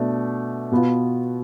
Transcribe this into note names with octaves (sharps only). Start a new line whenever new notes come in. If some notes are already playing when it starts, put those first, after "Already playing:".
Already playing: B2 A3 D4
B2 B3 F4